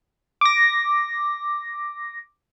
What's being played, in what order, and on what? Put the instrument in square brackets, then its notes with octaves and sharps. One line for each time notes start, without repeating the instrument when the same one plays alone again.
[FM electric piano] D6 A#6